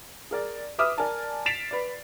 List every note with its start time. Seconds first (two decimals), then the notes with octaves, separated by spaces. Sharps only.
0.31 G#4 A#4 D5
0.78 B4 E5 D6 D#6 F6
0.98 A#4 D5 G#5 A5
1.46 A6 B6 C7 D7 E7 F7
1.71 B4 D5